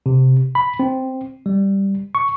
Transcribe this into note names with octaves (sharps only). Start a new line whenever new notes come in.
C3
B5
C4
G3
C#6